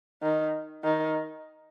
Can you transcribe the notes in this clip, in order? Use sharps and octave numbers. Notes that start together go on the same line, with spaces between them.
D#3
D#3